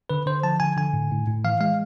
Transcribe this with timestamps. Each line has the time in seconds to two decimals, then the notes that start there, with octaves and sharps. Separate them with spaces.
0.10 D3 B4
0.26 D3 C5
0.43 F3 A5
0.60 D3 G#5
0.77 D3 G#5
0.93 A2
1.11 A2
1.27 A2
1.45 E3 F5
1.61 G#3 F5